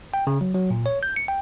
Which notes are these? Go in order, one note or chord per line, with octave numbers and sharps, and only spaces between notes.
G5
C#3
F#3
F#3
A#2
C#5
G6
C#7
G5